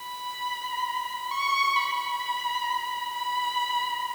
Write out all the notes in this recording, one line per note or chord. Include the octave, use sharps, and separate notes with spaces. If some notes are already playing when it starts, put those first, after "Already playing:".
Already playing: B5
C#6
B5
B5